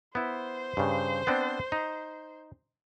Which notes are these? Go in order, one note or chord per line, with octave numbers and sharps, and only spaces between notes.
B3 E4 C5
G2 C#3
B3 C4 D4
D#4